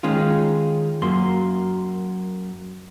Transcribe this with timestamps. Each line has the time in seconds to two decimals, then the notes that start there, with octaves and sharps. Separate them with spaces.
0.03 D#3 G#3 C#4 F4
1.02 F#2 A#3 C6